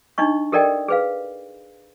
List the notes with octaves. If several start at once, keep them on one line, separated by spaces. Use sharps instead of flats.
D4 D#4 D#5 C#6
G4 A4 A#4 D5 D#5 G5
G#4 B4 F5